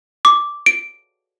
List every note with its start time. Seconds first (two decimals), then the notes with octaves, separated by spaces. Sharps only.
0.25 D6
0.66 D7